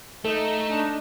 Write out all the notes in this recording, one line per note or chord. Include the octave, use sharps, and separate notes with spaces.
A3 D#4 A4
D4